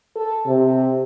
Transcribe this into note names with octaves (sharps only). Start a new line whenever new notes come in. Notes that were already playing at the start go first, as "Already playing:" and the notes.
A4
C3